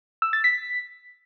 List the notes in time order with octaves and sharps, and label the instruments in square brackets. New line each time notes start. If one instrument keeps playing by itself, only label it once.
[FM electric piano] E6
A6
B6